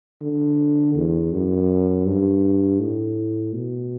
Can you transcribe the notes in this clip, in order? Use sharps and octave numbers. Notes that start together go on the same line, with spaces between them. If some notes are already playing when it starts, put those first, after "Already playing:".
D3
E2
F#2
G2
A2
B2